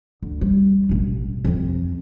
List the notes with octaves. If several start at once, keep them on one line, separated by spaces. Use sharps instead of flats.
D2
G3
E1 A1
F2 C4